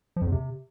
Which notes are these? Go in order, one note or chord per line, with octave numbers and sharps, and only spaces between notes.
F3
F2
E2
C3